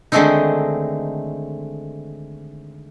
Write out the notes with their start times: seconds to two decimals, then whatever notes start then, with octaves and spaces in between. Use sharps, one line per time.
0.12 D3 D#3 G#3 A3 C4 D#4